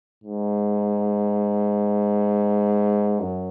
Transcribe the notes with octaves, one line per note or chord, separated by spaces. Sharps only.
G#2
F#2